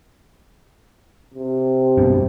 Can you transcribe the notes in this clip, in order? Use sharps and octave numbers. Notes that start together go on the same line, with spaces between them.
C3
G2 B2